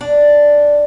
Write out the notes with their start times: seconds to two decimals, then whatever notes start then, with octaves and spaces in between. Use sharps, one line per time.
0.01 D4